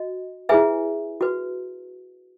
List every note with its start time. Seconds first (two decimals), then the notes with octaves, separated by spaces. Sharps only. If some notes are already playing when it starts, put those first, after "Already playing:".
Already playing: F#4 D#5
0.49 E4 G#4 B4 E5 G#5
1.21 F#4 B4